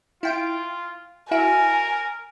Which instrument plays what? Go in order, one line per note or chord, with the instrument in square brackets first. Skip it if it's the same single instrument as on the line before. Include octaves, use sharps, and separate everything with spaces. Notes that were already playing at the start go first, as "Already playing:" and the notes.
[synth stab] E4 G5 D7 [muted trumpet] F4
[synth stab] E4 F#4 E5 [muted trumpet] A#4 [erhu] G#5